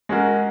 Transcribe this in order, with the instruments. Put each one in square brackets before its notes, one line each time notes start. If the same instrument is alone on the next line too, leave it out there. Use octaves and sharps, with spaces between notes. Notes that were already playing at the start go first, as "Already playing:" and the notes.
[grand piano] G#3 C#4 F#4 A#4